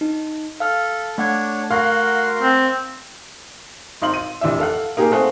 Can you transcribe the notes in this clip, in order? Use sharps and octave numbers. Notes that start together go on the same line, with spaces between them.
D#4
A4 F5 F6
A3 D4 C#5 F#5 G#6
F#4 A#4 F5 C6
C4
G#1 D#4 F5 C6 F#7
D#7
F1 E3 D4 E5
A4 F5 F#5
A#3 D#4 G4 G#4 A#4
A3 C4 F4 G#4 F#5